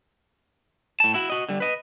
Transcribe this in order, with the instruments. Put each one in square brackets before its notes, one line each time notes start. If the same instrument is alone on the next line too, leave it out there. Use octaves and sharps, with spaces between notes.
[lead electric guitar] A2 A5
E4 F#4
F#4 D#5
D3 G3
B4 D#5